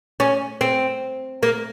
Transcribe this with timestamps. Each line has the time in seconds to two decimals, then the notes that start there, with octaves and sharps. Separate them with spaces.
0.20 C#4
0.61 C4
1.43 A#3